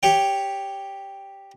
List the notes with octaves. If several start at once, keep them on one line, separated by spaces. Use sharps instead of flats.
G4 C#5 G5